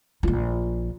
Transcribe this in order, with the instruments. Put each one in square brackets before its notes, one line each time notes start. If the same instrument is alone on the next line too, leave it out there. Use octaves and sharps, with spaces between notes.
[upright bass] A#1 F4